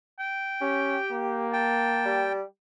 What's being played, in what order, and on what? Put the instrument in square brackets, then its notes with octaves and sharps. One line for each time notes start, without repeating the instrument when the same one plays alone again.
[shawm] G5
[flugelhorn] C#4 [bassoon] G4
[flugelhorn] A#3
[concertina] G5 [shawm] A5
[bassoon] G3